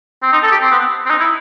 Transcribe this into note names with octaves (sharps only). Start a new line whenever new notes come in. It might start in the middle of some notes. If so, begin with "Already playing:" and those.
C4
D#4
A4
G4
C4
B3
C4
D#4
E4